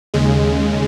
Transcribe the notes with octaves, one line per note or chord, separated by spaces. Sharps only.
D#2 C#3 G#3